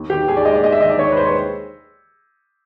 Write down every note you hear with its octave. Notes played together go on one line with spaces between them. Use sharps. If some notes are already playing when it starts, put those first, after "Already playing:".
Already playing: D#2
D#3 G4
D#2 G#4
D5
G#3 D#5
D5
D#2 D#5
E5
D#3 D#5
D5
D#2 C#5
B4
G#3 C5
C#5